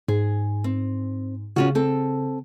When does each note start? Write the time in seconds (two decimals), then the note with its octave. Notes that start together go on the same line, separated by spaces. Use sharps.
0.08 G#2 G#4
0.64 C4
1.56 C#3 C#4 F4 F#4
1.75 C4 A4